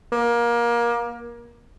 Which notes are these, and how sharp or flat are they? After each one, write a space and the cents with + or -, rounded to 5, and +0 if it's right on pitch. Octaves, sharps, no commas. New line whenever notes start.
A#3 +25